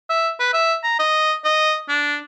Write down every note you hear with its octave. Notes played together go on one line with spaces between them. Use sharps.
E5
B4
E5
A#5
D#5
D#5
D4